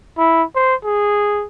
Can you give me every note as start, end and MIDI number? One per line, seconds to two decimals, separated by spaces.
0.18 0.43 64
0.55 0.75 72
0.84 1.46 68